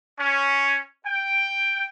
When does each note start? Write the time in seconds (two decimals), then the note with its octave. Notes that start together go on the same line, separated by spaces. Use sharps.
0.18 C#4
1.04 G5